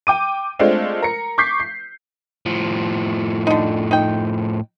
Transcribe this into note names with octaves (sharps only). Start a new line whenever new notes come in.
G5 D6 D#7
G#3 A3 C4 D4 F4
A#4 C#7
C#6 D6 G6 B6 C7
C7
A2 F3
D3 D#4
D#4 G5